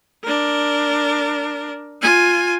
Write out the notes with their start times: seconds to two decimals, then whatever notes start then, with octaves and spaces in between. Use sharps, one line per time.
0.24 D4 A#4
2.02 F4 G#5